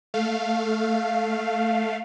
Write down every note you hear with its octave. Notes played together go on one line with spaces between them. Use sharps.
A3 F5